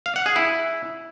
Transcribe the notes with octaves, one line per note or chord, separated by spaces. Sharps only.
F5
F#5
G#4
E4